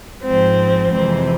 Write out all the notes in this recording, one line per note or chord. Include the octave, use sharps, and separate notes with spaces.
G#2 F3 G#3 C4
F2 C3 E3 G#3 C4